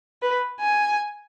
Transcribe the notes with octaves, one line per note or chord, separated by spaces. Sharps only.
B4
G#5